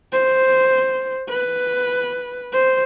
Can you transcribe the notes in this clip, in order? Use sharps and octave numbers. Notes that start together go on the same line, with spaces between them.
C5
B4
C5